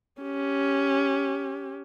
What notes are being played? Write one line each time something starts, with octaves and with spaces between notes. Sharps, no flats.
C#4 G4